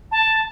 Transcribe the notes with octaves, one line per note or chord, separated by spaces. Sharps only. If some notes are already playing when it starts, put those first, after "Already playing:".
A5